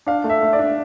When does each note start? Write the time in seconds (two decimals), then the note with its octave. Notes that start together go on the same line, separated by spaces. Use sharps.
0.06 D4 F5
0.24 A3
0.30 E5
0.42 A3
0.53 D5
0.59 D4